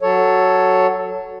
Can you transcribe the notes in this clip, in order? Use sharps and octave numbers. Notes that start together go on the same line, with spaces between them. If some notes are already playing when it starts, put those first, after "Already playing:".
F#3 A4 C#5